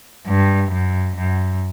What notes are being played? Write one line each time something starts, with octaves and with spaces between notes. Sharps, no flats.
G2
F#2
F#2